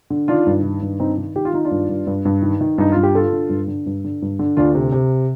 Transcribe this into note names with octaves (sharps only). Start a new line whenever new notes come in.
D3
D#3 D4 F4
G2
D#3
G2
D#3 C4 D#4
D#3
D#3 G4
F4
D#3 D#4
D4 F4
G2
G2
G2
G2
D#3
D#3
G2 D#4
G2 F4
G4
D3 F4 A4
D3
G2
D3
G2
D3
G2
D3
D2 D4 F4
C3
C3